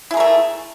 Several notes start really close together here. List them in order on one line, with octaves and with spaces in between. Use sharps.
E4 G#4 A#4 A3